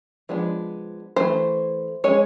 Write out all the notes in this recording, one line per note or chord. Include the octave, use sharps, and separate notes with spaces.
F3 G#3 B3 D4
E3 A3 C5
G#3 C#4 C#5